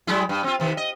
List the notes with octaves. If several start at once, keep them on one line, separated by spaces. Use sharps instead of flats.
F#3 G#3 E4
G2
C4 F4
C3 D#3
D#5